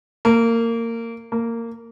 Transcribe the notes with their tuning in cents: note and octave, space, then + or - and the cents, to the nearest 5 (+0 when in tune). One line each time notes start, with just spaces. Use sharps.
A#3 -20
A#3 -15